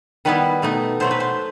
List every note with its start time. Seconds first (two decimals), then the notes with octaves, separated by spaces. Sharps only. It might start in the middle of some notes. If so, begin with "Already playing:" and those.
0.25 D#3 G3 B3 E4 B4
0.62 B2 A3 D#4
1.00 B2 F#3 A3 C5
1.11 B4
1.20 C5